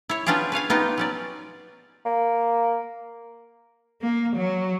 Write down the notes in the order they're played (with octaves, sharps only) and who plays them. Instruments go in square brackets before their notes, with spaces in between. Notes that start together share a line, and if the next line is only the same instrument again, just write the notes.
[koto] E4 C#5
B3 C#4 D4 F4 G4 G#4
B4 C#5 F5 G#5
B3 D#4 F4 G4
F#3 C#4 D5
[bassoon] A#3
[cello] A#3
F#3